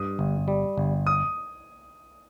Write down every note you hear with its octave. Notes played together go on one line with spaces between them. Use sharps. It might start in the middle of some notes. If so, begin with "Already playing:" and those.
Already playing: G2 D#6
G1
G3
G1
D#6